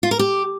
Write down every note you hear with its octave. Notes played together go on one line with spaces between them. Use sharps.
F4
A#4
G4